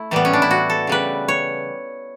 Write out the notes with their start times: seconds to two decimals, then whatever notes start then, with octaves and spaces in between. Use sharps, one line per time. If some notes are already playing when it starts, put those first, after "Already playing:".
Already playing: A3 E4
0.11 A2 E3 G3 B3
0.25 C#4
0.33 D4
0.42 E4
0.51 F#4
0.70 A4
0.87 C#3 G3 B4
1.28 C#5